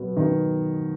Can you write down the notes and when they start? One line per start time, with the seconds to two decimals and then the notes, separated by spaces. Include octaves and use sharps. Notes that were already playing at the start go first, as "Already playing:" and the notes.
Already playing: B2 F#3 B3
0.16 B2 D#3